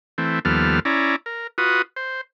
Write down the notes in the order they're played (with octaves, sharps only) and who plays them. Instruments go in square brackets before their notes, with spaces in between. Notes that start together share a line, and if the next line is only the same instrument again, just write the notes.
[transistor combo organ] E3 A3 C4
D#2 F3 G3 B3 A4 F6
C#4 E4 D5 A#5
A#4
F4 F#4 B4 D#6
C5